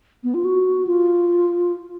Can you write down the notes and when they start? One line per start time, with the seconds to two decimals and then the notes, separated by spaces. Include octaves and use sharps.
0.24 B3
0.34 F4
0.45 F#4
0.87 F4